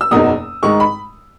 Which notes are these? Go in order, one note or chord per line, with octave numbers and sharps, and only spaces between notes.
E6
F#1 E2 B2 A#3 D#4 D#6
G#2 D#3 G#3 D#4 C#6
B5